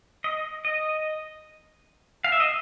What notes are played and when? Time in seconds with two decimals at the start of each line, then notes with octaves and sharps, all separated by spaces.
0.24 D#5
0.65 D#5
2.24 F5
2.32 E5
2.40 D#5